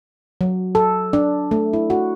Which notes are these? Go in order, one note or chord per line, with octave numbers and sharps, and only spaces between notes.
F#3
A4
D4
A3
E4
F#4